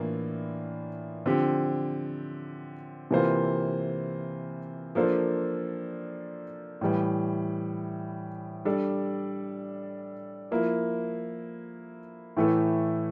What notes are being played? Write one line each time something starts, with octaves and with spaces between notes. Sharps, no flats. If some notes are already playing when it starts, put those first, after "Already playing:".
Already playing: A2 E3 A#3 D4 F4
D3 F3 C4 G4
C3 E3 A#3 F4 C5
F3 A#3 D4 A4 C5
A2 E3 G3
G3 D4 A4
F3 A#3 E4
A2 E3 A3 E4 A4